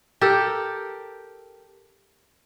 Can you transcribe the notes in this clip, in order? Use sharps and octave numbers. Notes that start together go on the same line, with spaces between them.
G4 A4 A#4